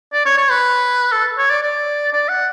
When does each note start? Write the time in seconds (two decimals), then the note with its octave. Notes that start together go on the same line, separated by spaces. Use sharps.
0.12 D5
0.26 C#5
0.37 C#5
0.50 B4
1.12 A4
1.38 C#5
1.50 D5
1.62 D5
2.13 D5
2.29 F#5